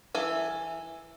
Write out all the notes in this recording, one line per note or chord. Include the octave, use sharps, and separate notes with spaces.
E3 A4 E5 G#5